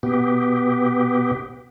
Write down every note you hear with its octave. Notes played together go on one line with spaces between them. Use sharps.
B2 B3 G4